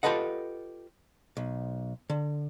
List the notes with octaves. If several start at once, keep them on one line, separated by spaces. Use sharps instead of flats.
F4 G4 A4 B4 D#5 F#5
B1
D3